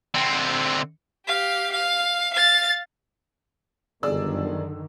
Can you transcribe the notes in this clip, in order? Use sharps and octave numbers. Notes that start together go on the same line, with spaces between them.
D3 C4
G4 F5
F5
F5 A6
G1 F#2 D3 D#3 G#4 D5 E6